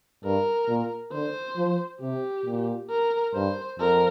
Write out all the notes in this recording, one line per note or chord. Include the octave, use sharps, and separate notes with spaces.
G2 A#4
A#2
D3 C5
F3
C3 G4
A#2
A#4
G2 C5
F2 A#4